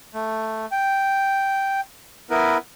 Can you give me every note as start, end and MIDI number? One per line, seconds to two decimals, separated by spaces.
0.14 0.66 57
0.72 1.81 79
2.30 2.58 59
2.30 2.58 64
2.30 2.58 70
2.30 2.58 71